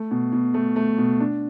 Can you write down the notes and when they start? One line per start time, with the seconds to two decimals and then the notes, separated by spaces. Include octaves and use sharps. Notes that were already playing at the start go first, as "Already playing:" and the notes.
Already playing: A3
0.11 B2
0.33 B2
0.54 A3
0.76 A3
0.98 B2
1.20 D4